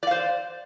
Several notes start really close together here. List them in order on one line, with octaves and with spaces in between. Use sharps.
D5 F5 C5